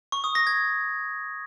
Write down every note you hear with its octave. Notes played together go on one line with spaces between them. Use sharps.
C#6
D#6
A#6
G#6